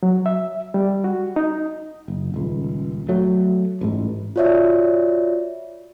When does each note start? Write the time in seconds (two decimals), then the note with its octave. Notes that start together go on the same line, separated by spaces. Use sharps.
0.03 F#3
0.26 E5
0.74 G3
1.04 F#4
1.36 D#4
2.08 F#1
2.34 D#1 C#2
3.09 F#3 A3
3.81 A1 G#2
4.36 F4 F#4 C#5 D5 E5